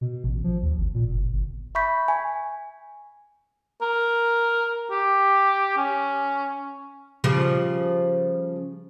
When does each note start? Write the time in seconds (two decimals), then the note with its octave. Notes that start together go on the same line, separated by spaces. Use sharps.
0.01 B2
0.24 A1
0.44 F3
0.62 D#2
0.78 G#1
0.94 A#2
1.09 F#1
1.32 G1
1.75 E5 B5 C#6 G6 B6
2.08 G#5
3.82 A#4
4.90 G4
5.77 C#4
7.24 C#3 F3 G3